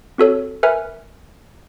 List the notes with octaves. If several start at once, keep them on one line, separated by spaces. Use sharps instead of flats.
C4 F#4 A4 C#5
A#4 B4 E5 G#5